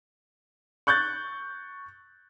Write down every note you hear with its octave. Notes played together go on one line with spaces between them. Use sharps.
C#6 F#6 G6 A6